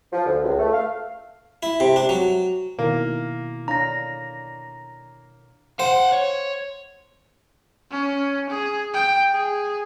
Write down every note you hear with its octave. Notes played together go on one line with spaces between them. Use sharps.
F3
D2
C#2
A3
F5
E4
C3
D4
F#3
B2 D#3 A#3 E4
D4 C#5 F5 A#5 A#6
C5 F5 F#5
C#5
C#4
G#4
G5
G#4